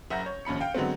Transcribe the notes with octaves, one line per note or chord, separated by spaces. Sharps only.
F#1 E5 F#5 A#5 G6 A#6
C#5
A#1 D#2 C#4 B5 C#7
F5 G5
D3 F#3 G#3 B3 C4